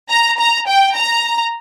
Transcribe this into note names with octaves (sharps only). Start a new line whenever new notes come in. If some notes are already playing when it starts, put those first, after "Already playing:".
A#5
A#5
G5
A#5